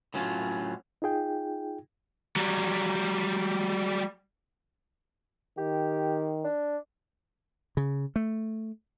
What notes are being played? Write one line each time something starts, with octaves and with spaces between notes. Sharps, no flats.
A2 F#3 C#4 F4
D#4 F4 G#4 G5
F#3 G3
D#3 G4
D4
C#3
A3